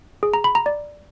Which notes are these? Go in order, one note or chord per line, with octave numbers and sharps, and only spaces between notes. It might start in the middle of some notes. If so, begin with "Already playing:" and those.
G#4
A#5
B5
A#5
D5